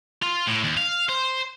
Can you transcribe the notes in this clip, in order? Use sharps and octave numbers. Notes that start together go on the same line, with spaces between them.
F4
A2
D#2
F5
C5